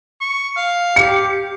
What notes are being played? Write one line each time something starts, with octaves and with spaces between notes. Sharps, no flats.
C#6
F5
G4 C#7